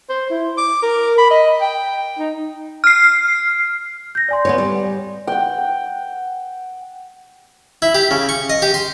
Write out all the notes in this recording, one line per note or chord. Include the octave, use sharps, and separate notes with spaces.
C5
E4
D6
A#4
B5
D#5
G5
D#4
F6 C7
G6 A#6
D5 G#5 C6
B3 F4 C#5
G3
F#5 G5
E4
G4
C#3
C#6
D#5
G4
C6